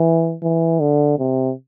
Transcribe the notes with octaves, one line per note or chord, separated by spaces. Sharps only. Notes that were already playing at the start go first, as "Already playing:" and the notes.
Already playing: E3
E3
D3
C3